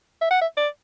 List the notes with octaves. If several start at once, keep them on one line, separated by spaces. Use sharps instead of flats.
E5
F#5
E5
D5